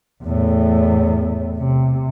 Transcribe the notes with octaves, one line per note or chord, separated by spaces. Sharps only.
E2 A2
C3